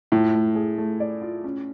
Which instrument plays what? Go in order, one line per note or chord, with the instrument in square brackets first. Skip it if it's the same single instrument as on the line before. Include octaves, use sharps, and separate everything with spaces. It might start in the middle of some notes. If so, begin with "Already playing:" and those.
[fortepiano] A2 [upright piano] F4
[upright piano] A3
G#4
A3
D5
F4
C#4